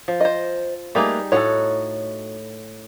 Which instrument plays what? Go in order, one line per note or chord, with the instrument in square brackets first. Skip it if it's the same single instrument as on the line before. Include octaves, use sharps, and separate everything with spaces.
[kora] F3
[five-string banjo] C5 D#5
[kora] G3 D#4 G#4 [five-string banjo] A3 A#3 B4
[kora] A2 A4 [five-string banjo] D#4 F#4 C#5